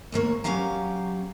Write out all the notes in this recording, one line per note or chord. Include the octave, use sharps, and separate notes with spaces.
D#2 G#2 A#3 C#5
F#3 B3 C#4 G4 F5 A#5